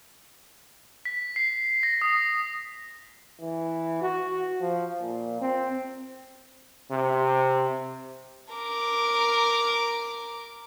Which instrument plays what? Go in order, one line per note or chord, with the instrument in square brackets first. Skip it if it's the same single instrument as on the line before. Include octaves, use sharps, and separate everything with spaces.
[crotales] B6
C7
A#6
D#6
[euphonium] E3
F#4
F3
A#2
C4
[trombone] C3
[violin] A#4 D6